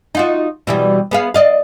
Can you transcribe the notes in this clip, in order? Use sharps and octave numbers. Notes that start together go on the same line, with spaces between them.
D#4 F4 F#4
B2 E3 G3
B3 G#4 F5
D5 D#5 F5